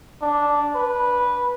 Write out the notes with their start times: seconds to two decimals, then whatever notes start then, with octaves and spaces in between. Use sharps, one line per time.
0.21 D4
0.75 B4